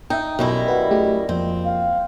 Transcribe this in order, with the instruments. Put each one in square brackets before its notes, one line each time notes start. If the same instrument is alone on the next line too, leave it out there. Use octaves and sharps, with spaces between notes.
[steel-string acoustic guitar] D#4 [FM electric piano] E5 G5
[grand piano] B1 [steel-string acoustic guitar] F#2 G3 E4 [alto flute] D#5
[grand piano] F#4 E5 F#5 [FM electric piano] B4
[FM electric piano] A3 G4 G#4
[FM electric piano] F2 [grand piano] F3 A#3 [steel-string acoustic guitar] C4
[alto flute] F5